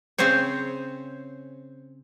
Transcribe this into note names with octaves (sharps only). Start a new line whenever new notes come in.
C#3 C4 G#4 C5 C#5